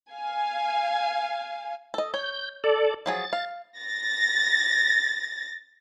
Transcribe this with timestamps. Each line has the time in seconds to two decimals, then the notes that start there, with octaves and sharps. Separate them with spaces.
0.12 F5 G#5
1.94 A4 D#5
2.14 C#5 G6
2.64 A4 D5
3.06 F3 F#3 G#4 A6
3.33 F5
3.80 A6 A#6